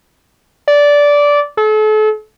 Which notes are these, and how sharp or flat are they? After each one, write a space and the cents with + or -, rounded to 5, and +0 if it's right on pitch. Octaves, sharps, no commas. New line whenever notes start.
D5 -15
A4 -40